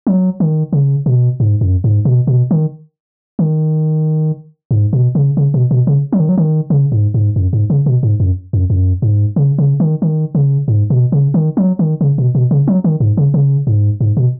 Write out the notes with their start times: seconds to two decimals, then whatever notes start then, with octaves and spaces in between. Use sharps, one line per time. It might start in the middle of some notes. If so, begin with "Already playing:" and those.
0.07 F#3
0.40 D#3
0.73 C#3
1.06 B2
1.40 G#2
1.61 F#2
1.84 G#2
2.05 B2
2.27 B2
2.51 D#3
3.39 D#3
4.71 G#2
4.93 B2
5.15 C#3
5.37 C#3
5.54 B2
5.71 B2
5.87 C#3
6.13 F#3
6.20 D#3
6.29 F#3
6.38 D#3
6.70 C#3
6.92 G#2
7.14 G#2
7.36 F#2
7.53 G#2
7.70 C#3
7.86 B2
8.03 G#2
8.20 F#2
8.53 F#2
8.70 F#2
9.02 G#2
9.36 C#3
9.58 C#3
9.80 D#3
10.02 D#3
10.35 C#3
10.68 G#2
10.90 B2
11.12 C#3
11.34 D#3
11.57 F#3
11.79 D#3
12.01 C#3
12.18 B2
12.35 B2
12.51 C#3
12.68 F#3
12.84 D#3
13.00 G#2
13.17 C#3
13.34 C#3
13.67 G#2
14.01 G#2
14.17 B2